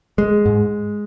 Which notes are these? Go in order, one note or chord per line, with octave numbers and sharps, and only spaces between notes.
G#3
G#2